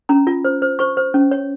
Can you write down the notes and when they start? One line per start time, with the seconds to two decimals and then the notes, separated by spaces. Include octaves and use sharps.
0.09 C#4 A#5
0.27 F4
0.45 C5
0.62 C5
0.79 C5 C#6
0.97 C5
1.14 C#4
1.31 C#5